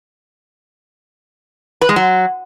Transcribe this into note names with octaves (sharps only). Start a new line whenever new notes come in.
B4
G#3
F#3